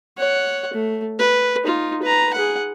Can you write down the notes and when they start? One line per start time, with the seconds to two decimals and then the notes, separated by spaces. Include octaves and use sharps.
0.18 C#5 F#5
0.73 A3
1.19 B4
1.64 D#4 F4
2.02 B4 A#5
2.34 G#4 F#5